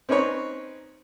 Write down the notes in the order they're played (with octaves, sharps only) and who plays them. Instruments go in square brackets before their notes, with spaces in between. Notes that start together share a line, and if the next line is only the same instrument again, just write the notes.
[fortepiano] C4 C#4 D#4 B4 C#5